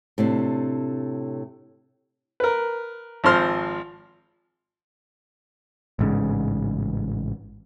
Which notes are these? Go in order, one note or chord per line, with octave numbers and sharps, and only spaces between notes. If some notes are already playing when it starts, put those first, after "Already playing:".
A2 C3 D4
A#4 B4
G#1 F3 C5 C6 F6
A1 G#2 C#3